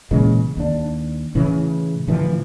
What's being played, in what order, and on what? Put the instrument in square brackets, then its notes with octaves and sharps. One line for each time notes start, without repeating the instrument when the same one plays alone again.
[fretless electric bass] A#2 C#3 E3 G#3
D#2 D4
A2 C#3 E3
A2 D3 E3 F3